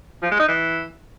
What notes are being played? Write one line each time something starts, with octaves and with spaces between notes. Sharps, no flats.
F3
G#3
D#4
E3